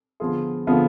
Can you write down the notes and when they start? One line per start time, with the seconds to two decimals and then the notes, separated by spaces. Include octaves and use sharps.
0.20 D3 F3 B3 F4 G#4
0.67 D3 F3 B3 F4 G#4